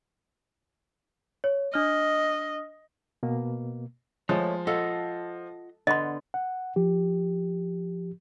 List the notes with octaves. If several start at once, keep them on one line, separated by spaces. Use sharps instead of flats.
C#5
D4 D#5 F6
B2 A#3
F3 G#3 A3 C#5
F4 A4 D#5 F5 F#5
D3 B3 D#5 C6
F#5
F3 G4